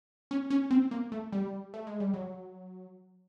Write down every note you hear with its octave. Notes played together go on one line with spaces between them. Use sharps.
C#4
C#4
C4
A#3
A3
G3
A3
G#3
G3
F#3